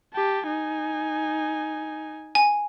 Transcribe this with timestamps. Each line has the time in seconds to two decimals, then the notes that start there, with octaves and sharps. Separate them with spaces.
0.14 G4 A5
0.47 D#4 G#5
2.35 G#5